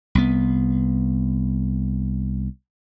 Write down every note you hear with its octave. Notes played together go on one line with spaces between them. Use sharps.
C2 B3